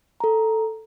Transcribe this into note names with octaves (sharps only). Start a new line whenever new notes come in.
A4 A#5